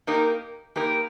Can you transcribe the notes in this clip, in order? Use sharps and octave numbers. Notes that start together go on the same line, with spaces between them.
A#3 D#4 G4 A#4
A#3 D#4 G4 A#4